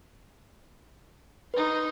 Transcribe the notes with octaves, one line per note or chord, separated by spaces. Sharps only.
D#4 B4 C6